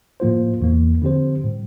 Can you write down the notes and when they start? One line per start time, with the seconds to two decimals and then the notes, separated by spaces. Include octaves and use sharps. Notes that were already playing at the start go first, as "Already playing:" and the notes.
0.20 A2 F3 A#3 F4 C5
0.61 E2 E3 A#3
1.02 D3 F3 C4 G4 C5
1.44 A2 G3